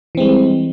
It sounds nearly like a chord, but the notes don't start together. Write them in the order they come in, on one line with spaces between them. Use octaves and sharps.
E3 C4 G#3 G3